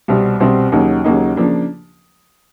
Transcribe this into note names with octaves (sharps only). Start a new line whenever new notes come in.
C2 B2 G3 C4
C2 B2 G3 C4
D#2 C#3 F#3 A#3 D#4
D#2 C#3 F#3 A#3 D#4
C#3 F3 A#3 D4